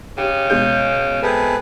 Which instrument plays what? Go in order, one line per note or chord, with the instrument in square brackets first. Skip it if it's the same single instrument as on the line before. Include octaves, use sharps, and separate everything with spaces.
[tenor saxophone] C#3 [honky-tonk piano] G4
[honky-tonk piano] B2 G#3 G6
[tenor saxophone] C3 [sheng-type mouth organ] G#4 A4 B4